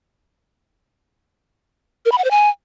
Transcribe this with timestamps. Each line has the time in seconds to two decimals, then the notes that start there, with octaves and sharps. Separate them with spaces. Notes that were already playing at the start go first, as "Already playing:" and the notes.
2.05 A#4
2.12 B5
2.18 F#5
2.24 C5
2.31 G#5